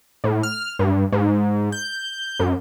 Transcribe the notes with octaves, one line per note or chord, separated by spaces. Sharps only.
A2
F6
G2
G#2
G6
F#2